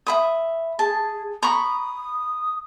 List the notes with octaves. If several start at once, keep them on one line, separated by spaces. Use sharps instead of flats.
E5 B5 D#6
G#4 A5
A#5 B5 C#6 D#6